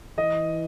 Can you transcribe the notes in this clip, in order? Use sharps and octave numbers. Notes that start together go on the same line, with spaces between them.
E3 D#5